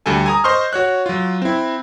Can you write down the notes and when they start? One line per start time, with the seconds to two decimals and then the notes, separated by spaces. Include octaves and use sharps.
0.06 D2 G3 A4 G#5
0.26 G#5 A#5 D#6
0.44 C5 D#5 C6 C#6 F6
0.73 F#4 C#5 F#6
1.06 F#3 F4
1.42 C4 E4